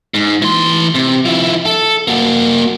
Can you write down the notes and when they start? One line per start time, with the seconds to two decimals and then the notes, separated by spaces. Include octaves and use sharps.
0.14 G#2
0.42 E3 C6
0.95 C3
1.25 F3 E4
1.66 A4
2.08 A#3 F#4